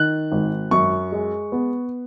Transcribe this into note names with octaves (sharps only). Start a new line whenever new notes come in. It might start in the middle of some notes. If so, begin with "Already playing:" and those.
Already playing: D#3 F#6
G#1
F#2 C#6
G#3
B3